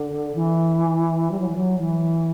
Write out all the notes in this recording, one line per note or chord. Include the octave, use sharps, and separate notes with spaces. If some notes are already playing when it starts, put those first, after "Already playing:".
Already playing: D3
E3
G3
F#3
E3
F#3
E3